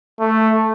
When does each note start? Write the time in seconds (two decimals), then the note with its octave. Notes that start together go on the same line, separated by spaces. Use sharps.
0.20 A3